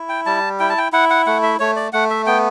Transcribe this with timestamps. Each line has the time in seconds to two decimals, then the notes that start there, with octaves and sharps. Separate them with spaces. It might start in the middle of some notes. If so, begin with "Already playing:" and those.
Already playing: E4
0.09 G5
0.26 G3 A5
0.60 E4 G5
0.69 A5
0.78 G5
0.93 E4 F#5
1.10 F#5
1.26 A3 F#5
1.43 E5
1.59 A3 C#5
1.76 D5
1.93 A3 F#5
2.10 E5
2.26 B3 G5